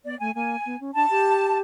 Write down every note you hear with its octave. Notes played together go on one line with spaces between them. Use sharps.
B3 D5
A3 G#5
A#3 G#5
B3
C#4
D4 A5
G4